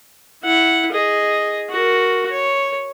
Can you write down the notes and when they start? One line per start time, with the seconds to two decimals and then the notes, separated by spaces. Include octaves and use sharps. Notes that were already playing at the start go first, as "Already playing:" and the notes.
0.44 E4 F#5
0.92 G#4 D#5
1.70 F#4 A#4
2.31 C#5